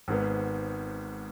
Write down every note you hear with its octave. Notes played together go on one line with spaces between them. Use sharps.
G#1 G#2 G#3 B3